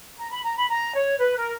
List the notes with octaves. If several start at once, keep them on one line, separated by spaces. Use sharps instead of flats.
A#5
B5
A#5
B5
A#5
C#5
B4
A#4